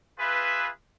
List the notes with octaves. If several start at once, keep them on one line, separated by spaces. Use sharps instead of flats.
F4 G#4 B4 E5